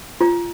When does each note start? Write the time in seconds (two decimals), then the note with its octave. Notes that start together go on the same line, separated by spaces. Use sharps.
0.21 F4